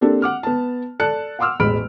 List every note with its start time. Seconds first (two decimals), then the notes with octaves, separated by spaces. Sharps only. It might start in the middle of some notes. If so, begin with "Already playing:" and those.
0.01 A#3 C4 D4 G4 A4
0.22 F#5 D6 F6
0.43 B3 A5
0.99 A4 D5 A5 F#6 C#7
1.39 F5 F#5 C6 D6 E6 F6
1.59 E1 A1 G#3 B5 F6 D7